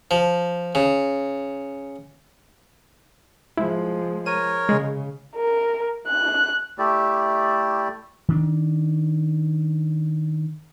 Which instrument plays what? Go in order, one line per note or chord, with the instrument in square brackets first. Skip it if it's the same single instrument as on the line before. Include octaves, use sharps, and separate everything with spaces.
[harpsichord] F3
C#3
[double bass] F3 G#3 [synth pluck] E4
[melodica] A#4 C#5 [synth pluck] D#7
[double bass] C#3 [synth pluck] G#3
[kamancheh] A#4
F#6
[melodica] A3 E4 G4 D5
[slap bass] D#3 D4